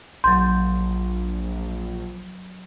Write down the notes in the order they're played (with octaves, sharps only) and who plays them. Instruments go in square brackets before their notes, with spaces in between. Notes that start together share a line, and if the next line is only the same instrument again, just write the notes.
[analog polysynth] A#1 [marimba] F#3 G6 [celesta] C6